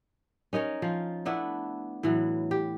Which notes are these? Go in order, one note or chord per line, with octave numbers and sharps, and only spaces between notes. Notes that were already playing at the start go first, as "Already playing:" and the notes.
C#4 D#4 A#4 C#5
F3 F4
A3 B3 D4 E4
A2 E3 F#3
G4